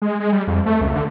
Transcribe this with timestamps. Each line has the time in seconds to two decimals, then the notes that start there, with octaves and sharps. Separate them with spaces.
0.02 G#3
0.20 G#3
0.32 G3
0.47 F2
0.66 A3
0.81 C#2
0.96 D3